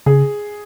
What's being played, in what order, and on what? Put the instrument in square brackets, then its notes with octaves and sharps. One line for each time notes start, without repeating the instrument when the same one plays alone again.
[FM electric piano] C#3 [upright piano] G#4